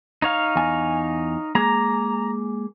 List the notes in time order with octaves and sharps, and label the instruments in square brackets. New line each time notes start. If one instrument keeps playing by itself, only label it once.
[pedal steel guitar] D#4 C#5 F5
[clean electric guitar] E2 G#5
[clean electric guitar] G#3 A#3 G#4 [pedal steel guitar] A#5